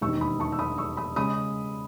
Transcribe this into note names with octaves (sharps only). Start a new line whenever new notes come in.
E1 D#2 D#3 C#6 E6
B5 D#6
A5 C#6
E6
B5 D#6
C#6 E6
B5 D#6
C#3 G#3 B5 D#6